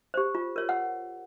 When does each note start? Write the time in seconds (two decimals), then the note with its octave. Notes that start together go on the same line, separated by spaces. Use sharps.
0.14 G4 C5
0.35 F4
0.56 A#4 C#5
0.69 F#5